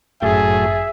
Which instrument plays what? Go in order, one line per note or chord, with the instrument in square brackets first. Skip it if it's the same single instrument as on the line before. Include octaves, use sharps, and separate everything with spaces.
[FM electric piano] G1 F#2 A6 [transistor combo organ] A2 F#3 [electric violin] G#4 [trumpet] E5